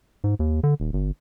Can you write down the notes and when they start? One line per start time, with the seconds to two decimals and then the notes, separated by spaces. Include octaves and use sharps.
0.24 G#2
0.39 D#2
0.63 D3
0.80 D#1
0.93 G1